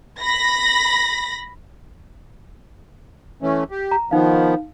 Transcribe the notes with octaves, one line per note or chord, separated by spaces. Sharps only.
B5 A#6
E3 A3 C#4
G4
A#5
D#3 F3 B3 D#4 F5